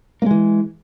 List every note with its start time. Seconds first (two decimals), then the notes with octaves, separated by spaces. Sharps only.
0.22 A#3
0.26 G#3
0.31 E3